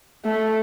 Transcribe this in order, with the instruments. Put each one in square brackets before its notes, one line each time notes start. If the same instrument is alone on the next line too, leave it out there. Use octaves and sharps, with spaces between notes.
[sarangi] A3